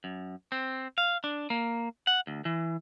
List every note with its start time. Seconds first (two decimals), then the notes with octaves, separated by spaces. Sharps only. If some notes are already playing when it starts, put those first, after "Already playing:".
0.04 F#2
0.52 C4
0.98 F5
1.24 D4
1.50 A#3
2.07 F#5
2.27 D2
2.45 E3